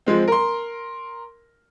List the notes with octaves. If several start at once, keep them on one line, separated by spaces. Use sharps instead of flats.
F3 G#3 C4
A#4 C6